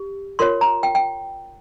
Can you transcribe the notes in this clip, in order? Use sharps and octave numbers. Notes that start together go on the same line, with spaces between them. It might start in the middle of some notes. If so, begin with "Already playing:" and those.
Already playing: G4
F4 A#4 C#5 C6
A#5
G5
G5